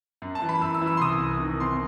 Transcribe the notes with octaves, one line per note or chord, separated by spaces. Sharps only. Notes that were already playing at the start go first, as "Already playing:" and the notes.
F#2
A5
E3
B5
F#2 E6
E6
E3
E6
C6
C2 D#6
C2
D#3
C3 C6